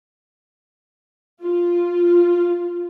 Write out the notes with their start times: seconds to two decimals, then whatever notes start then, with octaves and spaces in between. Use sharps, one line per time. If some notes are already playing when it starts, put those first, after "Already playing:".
1.41 F4